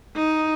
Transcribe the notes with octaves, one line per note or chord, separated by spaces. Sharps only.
D#4